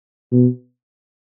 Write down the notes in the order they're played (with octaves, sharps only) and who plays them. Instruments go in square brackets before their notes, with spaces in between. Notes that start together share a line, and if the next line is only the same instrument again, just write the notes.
[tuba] B2